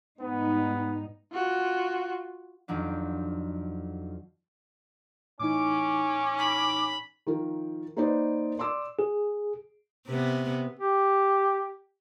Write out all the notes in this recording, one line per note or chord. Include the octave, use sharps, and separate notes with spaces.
G#2 G3 B3 D#4
F4 F#4
F2 D#3 F3 F#3 D4
A2 E3 C#4 D#4 D6
B5
D#3 F3 A#4
A#3 D#4 B4 C5 D5
D5 C6 D6 E6
G#4
C3 B3
G4